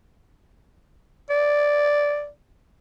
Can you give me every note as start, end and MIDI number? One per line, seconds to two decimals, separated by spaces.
1.30 2.28 74